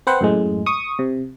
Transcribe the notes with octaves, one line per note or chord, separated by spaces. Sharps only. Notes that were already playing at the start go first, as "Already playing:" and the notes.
C4 B4 C5 F#5
F#2 A2 G#3
C#6 D#6
C3